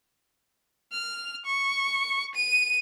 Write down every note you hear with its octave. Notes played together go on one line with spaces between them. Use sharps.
F6
C#6
D#7